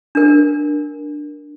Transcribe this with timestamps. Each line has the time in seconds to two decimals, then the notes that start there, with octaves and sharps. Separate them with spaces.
0.15 D4 A#4